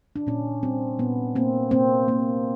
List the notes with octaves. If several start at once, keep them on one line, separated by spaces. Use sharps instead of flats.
D4
A#2 C#4
G3 C4
A#2 B3
A#3 C4
A#3 C4
A#3